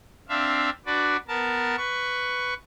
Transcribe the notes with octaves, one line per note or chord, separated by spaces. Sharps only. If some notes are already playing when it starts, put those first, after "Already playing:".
C4 D4 E5 F5
D4 F#4 B4 D5
B3 A#4 A5
B4 C#6